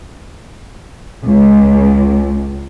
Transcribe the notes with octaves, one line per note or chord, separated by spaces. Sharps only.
C#2